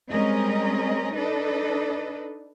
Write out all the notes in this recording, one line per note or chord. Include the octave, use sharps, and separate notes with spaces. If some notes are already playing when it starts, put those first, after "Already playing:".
G3 G#3 C4 C#4 A#4 D#5
D4 D#4 A4 B4 D#5